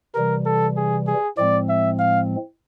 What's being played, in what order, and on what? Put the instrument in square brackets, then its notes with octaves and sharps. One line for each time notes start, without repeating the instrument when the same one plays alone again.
[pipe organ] C3 E3 G3 [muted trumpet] A#4
[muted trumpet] A4
G#4
G#4
[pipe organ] A2 F3 G#3 C4 [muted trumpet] D5
[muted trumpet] E5
F5